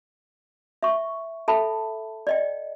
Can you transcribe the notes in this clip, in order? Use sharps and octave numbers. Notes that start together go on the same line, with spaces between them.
E5 C#6
A4 E5 A5 B5
D5 D#5 G5